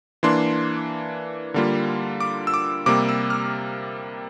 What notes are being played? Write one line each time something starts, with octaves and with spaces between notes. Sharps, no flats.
E3 A#3 D4 C6
D3 G3 A#3 F4
D6
E6
D6
C3 G3 A#3 D6
E6
F6